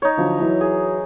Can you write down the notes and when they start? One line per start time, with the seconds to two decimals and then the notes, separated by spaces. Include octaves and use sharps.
0.02 D#4 C#5
0.17 D3 F3 F#3
0.40 E3 F#3 E4
0.61 G#4